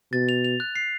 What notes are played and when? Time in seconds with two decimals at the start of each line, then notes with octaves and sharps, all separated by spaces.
0.12 B2 A6
0.29 F7
0.44 F7
0.60 F#6
0.76 C7